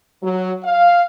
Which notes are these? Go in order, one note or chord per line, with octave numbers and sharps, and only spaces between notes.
F#3
F5